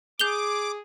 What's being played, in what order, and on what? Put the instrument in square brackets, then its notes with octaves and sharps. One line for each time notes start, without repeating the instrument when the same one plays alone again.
[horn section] G#4 [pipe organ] D6 [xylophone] G6 F7 G7